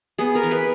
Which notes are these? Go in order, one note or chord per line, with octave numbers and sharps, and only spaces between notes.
B3 G#4
A#4
E3
B4